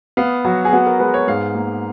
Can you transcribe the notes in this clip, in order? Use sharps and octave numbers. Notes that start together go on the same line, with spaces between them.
B3 F5
F#3 F#4
G#4
B3 F#4
A#4
G#3 B4
C#5
G#2 F5
A#3